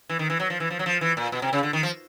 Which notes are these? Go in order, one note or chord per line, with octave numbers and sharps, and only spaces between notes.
E3
D#3
E3
F#3
F3
E3
F3
F#3
F3
E3
A#2
B2
C3
C#3
D3
D#3
F3